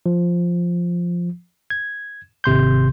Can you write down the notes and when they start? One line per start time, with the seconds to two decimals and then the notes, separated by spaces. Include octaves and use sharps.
0.06 F3
1.70 G#6
2.44 G#1 C3 C6 G6